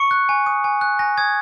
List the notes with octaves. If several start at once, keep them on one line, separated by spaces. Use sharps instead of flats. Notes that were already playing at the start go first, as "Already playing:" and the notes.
Already playing: C#6 C#7
F#6
G#5
D#6
G#5
F#6
G#5 A#6
D#6 G#6